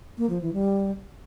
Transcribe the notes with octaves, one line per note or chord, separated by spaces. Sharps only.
A#3
F3
E3
G3